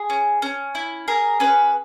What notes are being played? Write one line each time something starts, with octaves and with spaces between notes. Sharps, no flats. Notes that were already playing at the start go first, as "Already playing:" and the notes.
Already playing: G#4
C#4
C#4
E4
G#4 A#4
C#4 B4